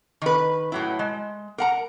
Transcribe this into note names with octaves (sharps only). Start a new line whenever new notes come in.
D#3 B4
A2 F#3 E4
G#3
A#4 F#5 A#5